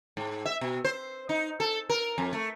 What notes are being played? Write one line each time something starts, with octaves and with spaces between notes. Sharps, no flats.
G#2
E5
B2
C5
D#4
A4
A#4
F2
A3